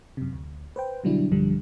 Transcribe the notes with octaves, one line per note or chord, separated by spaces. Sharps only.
F#2 C3
D2
B4 C5 G5
B2 D3 F#3 G3 D4 E4
B1 G2 D3 F3 G3